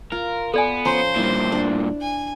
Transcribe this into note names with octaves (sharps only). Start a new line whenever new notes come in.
F4 A#4
B3 A4 D5 G#5
F3 C#4 C5 G#5 A#5 C6
G2 A#2 E4
D4
G#5